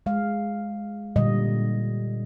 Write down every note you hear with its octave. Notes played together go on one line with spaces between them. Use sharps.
G#3 F5
A#2 D3 G3 D#5